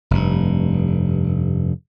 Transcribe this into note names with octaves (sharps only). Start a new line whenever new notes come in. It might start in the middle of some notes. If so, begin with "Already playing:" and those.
F1 G2